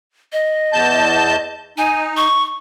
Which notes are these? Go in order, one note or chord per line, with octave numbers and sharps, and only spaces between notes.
D#5
E2 A5 G6
D#4 G#5
C#6